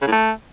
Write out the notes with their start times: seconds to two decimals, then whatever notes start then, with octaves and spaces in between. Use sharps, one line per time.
0.02 C#3
0.07 A2
0.12 A3